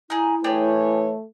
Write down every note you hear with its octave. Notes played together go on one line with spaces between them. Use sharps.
D#4 E4 G#4
E3 A3 D4 G4 G#4 B4 C#5